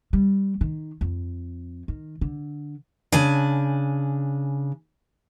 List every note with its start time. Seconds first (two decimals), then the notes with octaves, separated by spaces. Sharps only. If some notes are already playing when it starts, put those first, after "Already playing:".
0.13 G3
0.61 D#3
1.01 F2
1.88 D#3
2.21 D3
3.12 C#3 D4 G#5